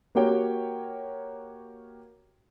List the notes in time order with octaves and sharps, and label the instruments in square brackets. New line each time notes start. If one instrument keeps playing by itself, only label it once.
[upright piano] A#3 F#4 G4 A#4 C#5 G5